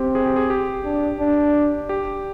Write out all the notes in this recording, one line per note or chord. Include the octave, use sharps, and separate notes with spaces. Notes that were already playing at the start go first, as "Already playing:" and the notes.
Already playing: C4 G4
G#4
G4
G#4
G4
D4
D4
G4